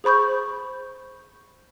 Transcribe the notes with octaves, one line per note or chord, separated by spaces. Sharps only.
G#4 C5 B5 C#6 G6